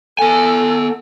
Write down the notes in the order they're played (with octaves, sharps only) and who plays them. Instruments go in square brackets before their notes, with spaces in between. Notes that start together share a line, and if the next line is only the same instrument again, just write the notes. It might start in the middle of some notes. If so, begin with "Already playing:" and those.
[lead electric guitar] B3 G#5 [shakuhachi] A4